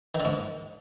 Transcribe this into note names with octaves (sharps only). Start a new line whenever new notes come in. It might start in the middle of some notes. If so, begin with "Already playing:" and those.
D#3
D3
G#2